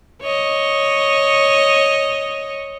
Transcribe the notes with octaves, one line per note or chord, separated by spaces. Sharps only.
C#5 D#5